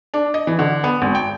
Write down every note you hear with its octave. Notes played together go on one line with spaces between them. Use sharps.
D4
D#5
E3
D3
B3
G#1
G5